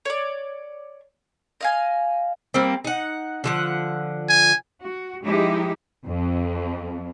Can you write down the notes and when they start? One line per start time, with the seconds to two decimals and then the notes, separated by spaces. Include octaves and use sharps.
0.05 C#5 D5
1.61 D#5 F5 G#5
2.54 G3 A#3 C4
2.85 D#4 F#5
3.44 D3 F3 F#5
4.29 G#5
4.83 F#4
5.24 F3 G#3 D#4 E4 G4
6.06 F2